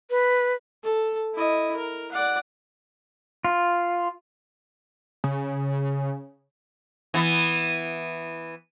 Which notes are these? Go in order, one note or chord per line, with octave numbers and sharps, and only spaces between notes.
B4
A4
E4 D#5
A#4
D5 F#5
F4
C#3
E3 B3